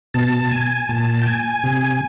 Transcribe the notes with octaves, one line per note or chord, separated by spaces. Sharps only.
B2 A5
G#5
A#2 A5
G5
G#5
C3